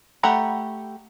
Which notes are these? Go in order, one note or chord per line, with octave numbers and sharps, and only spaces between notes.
A3 G4 F#5 A#5 B5